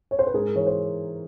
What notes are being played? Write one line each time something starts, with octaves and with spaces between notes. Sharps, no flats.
C#5
C5
B4
G#2 G#4 A#4
E3 C#5
C5